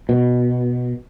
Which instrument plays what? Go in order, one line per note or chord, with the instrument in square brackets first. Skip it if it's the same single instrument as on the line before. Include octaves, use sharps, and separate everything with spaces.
[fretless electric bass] B2